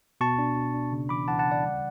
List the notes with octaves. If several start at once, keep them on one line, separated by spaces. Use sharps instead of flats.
B2 A5 C#6
D4
B2
D4
C#3
E3 B5 D6
E3 F#5 A5
F#5 A5
C#3
D5 F#5
G3